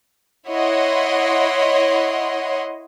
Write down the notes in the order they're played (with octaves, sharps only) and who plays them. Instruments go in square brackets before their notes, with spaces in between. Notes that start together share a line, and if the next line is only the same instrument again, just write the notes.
[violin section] E4 C#5 D#5 F#5 C6